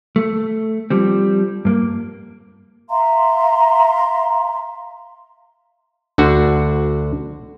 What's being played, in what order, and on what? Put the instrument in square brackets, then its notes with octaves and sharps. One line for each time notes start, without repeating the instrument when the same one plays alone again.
[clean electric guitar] A3
F3 G3 C4
G2 A#3
[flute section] E5 F5 A#5 C6
[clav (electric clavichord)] D2 D3 F#4